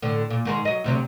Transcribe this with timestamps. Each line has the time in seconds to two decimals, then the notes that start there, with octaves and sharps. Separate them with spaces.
0.02 A2 D3
0.30 A#2
0.45 G#2 D#3 G#3
0.65 F#3 D#5
0.84 D2 C3 F#3